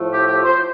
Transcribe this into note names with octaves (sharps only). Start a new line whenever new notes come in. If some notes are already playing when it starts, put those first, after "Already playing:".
Already playing: A2 F3 A3
G4
G4
C5